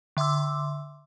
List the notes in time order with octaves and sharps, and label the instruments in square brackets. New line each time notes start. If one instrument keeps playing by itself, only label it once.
[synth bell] D3 E5 C6 D6 E6